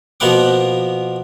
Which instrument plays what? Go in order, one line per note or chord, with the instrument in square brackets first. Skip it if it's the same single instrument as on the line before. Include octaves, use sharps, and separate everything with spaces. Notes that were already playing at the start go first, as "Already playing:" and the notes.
[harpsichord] B2 F3 A#3 B3 F#5 D6